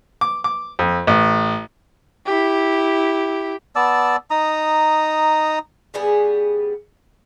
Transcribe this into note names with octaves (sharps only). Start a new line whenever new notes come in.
D6
D6
F2
A1
E4 G4
B3 D5 A5 E6
D#4 A#5 D#6
C#3 G3 B3 G#4